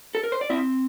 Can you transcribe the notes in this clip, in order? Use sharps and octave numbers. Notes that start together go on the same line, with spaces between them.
A4
A#4
C5
D5
C4 E4 E5